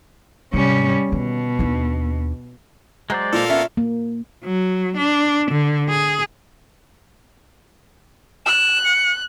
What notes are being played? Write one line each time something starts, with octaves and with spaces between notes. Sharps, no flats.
G#2 C3 G3 C#4
B2 D3 D#3
D#2 D4
F#3 G#3 C5 D5
A#2 A4 A#4 F5
B3 C#4 E5
A#3
F#3
D4
D3
G#4
F#6 E7
C#7